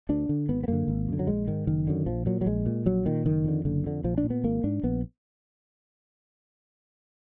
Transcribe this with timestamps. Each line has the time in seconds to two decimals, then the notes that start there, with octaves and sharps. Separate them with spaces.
0.09 D2 D4
0.29 D3
0.49 G#1 B3
0.63 B3
0.68 F#2 D3 A#3
0.88 G#1
1.09 F#2 D3
1.19 F#3
1.27 A#1 G#3
1.48 G#2 D#3
1.67 F#1 D#3
1.87 F#2 D3
2.06 A#1 F3
2.26 A#2 F#3
2.41 F#3
2.46 A#1 G#3
2.66 A#2
2.86 A#1 F#3
3.06 A#2 D#3
3.25 F#1 D#3
3.45 F2 D3
3.65 F#1 D3
3.84 F2 D3
4.04 A#1 F3
4.18 D4
4.24 A#2
4.30 B3
4.44 G#1 A#3
4.64 G#2 D4
4.83 A#1 B3